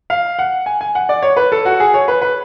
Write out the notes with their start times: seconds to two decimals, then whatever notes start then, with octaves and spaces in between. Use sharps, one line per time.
0.10 F5
0.39 F#5
0.66 G#5
0.81 G#5
0.95 F#5
1.09 D5
1.23 C#5
1.37 B4
1.52 A4
1.65 F#4
1.80 G#4
1.94 C#5
2.08 B4
2.22 B4